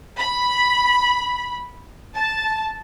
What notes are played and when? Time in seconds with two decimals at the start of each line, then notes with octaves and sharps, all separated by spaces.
0.18 B5
2.15 A5